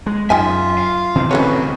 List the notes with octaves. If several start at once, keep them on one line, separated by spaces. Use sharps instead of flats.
G#3
F#2 D#4 F4 E5 G5 G#5
F5
B2 E3 C4
D2 C3 C#4 F#4 A4 B4 C#5